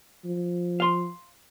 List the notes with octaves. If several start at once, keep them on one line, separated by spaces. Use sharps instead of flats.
F3
F5 C6